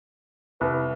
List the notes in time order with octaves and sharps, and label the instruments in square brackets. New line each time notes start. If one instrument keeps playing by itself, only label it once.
[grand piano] C2 [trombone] B4